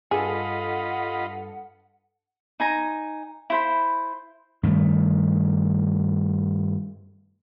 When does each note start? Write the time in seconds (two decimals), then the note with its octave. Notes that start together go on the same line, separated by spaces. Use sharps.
0.11 G2 F4 G#4 A4 D#5 F#5 B5
2.60 D#4 G#5 A#5
3.50 E4 C5 B5
4.63 G2 D#3 A3